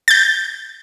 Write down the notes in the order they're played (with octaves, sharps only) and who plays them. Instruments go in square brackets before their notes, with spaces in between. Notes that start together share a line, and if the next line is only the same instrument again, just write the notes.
[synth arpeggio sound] G6 A6